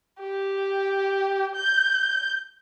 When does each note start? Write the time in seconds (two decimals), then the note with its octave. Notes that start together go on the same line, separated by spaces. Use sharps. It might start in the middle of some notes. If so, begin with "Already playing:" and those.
0.21 G4
1.55 G6